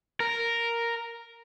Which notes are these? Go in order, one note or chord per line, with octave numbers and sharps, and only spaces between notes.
A#4